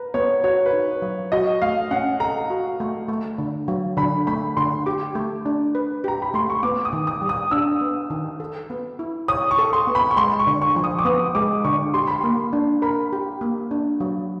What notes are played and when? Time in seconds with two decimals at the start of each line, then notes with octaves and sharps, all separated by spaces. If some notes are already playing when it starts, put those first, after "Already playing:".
Already playing: A#4 B4
0.14 B3 C#5
0.44 F#4 C#5
0.66 B4
0.73 D#4
1.02 F#3
1.32 F#4 D#5
1.62 A3 F5
1.91 C#4 F#5
2.20 A4 A#5
2.50 F#4
2.80 A3
3.08 A3
3.38 D3
3.68 F#3
3.97 D3 B5
4.27 A3 B5
4.57 D3 C6
4.86 G4 D6
5.15 A3
5.46 D4
5.75 B4
6.04 G4 A#5
6.22 B5
6.34 A3 C6
6.50 C#6
6.63 B3 D6
6.85 D#6
6.93 D#3
7.07 D#6
7.21 G3
7.29 D#6
7.51 D4 E6
7.81 B3
8.10 D#3
8.40 A4
8.70 B3
8.99 E4
9.28 C#5 D#6
9.51 C#6
9.59 A4
9.73 C6
9.87 B3
9.95 B5
10.11 C#6
10.17 G#3 C6
10.39 C#6
10.47 D3
10.62 C#6
10.76 F3
10.84 D#6
10.99 D6
11.05 B3 D#6
11.35 G#3 D6
11.65 D3 C#6
11.94 G4 C6
12.07 B5
12.21 A#3 C6
12.53 D4
12.82 A#4 B5
13.13 G4
13.41 A#3
13.71 D4
14.00 F#3